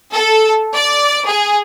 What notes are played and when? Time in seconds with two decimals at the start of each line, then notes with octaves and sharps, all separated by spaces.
0.13 A4
0.74 D5
1.28 G#4